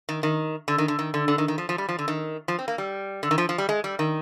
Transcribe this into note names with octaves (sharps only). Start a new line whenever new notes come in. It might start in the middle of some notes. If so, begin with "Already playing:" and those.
D#3
D#3
D3
D#3
D3
D#3
D3
D3
D#3
D#3
F3
F3
G3
F3
D3
D#3
F3
C4
A#3
G3
D3
D#3
F3
F3
G3
G#3
G3
D#3